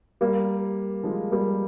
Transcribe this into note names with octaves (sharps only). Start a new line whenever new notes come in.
G3 A#3
F3 G#3
G3 A#3